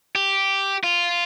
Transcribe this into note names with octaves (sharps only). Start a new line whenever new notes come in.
G4
F4